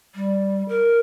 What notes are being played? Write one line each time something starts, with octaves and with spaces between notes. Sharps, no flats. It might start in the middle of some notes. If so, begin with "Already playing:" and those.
G3
A#4